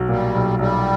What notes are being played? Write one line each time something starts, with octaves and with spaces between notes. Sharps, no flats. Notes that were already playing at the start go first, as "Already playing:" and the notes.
Already playing: B1 F#3
A#2 G3
B1
B1 G3